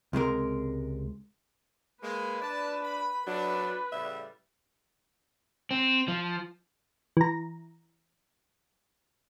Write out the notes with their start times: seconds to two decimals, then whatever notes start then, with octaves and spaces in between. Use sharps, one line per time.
0.13 C#2 C3 G#3 A#4
2.03 G#3 A#3 B4
2.42 D4 D5 A5
2.85 B5
3.27 F#3 D4 B4
3.92 A2 C#3 G3 E5
5.71 C4
6.08 F3
7.17 E3 A#5